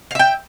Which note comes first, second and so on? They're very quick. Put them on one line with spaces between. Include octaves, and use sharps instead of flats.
F5 E5 G5